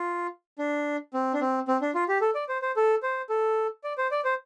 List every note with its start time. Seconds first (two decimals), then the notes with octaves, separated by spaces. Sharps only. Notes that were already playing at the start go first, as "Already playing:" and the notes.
Already playing: F4
0.59 D4
1.14 C4
1.33 D4
1.41 C4
1.68 C4
1.82 D4
1.95 F4
2.08 G4
2.21 A4
2.35 D5
2.49 C5
2.62 C5
2.76 A4
3.03 C5
3.29 A4
3.84 D5
3.98 C5
4.11 D5
4.24 C5